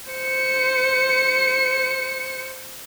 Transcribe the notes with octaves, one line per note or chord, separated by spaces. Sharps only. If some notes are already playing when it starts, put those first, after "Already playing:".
C5 C#7